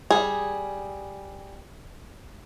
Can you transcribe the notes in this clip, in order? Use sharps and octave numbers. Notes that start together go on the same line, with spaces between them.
G3 G#4